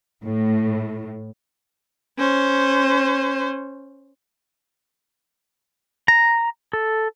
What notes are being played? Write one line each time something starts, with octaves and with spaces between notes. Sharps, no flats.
A2
C#4 C5
A#5
A4